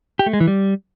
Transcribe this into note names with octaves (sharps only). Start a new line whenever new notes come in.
G4
A3
G#3
E3
G3